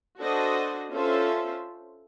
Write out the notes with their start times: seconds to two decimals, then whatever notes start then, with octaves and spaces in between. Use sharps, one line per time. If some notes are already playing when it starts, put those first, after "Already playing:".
0.21 D4 F#4 A4 C5 D#5
0.92 C#4 F4 A4 C5 E5